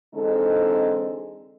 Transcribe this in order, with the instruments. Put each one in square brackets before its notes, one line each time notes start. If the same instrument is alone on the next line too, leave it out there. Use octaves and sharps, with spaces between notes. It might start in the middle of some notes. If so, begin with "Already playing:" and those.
[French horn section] D3 E3 G#3 C4 D#4 A4